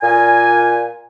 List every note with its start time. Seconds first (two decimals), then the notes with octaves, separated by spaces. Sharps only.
0.02 A#2 G#5